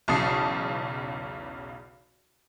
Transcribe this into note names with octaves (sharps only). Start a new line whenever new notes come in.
B1 E2 C#3 A5 D#6 C7